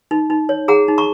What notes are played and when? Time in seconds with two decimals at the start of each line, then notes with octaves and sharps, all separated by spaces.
0.11 D#4
0.30 D#4
0.49 C#5
0.68 G#4 F#5 A#5
0.88 D#4
0.98 A#5 C#6